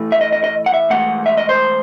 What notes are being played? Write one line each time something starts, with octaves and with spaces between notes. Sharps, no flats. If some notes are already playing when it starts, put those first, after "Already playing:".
Already playing: A2 E3 A3
E5
D#5
D#5
D#5
F#5
E5
G#2 E3 A3 F#5
E5
D#5
C5